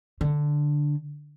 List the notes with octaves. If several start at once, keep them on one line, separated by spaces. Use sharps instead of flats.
D3